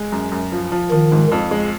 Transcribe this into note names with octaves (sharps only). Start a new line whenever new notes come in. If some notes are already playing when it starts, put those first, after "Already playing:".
Already playing: G#3
F#2
F#2
F3
F3
D#3 F3
G#2
F2
G#3